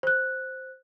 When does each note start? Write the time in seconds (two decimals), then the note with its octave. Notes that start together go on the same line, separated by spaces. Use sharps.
0.03 C5 F#6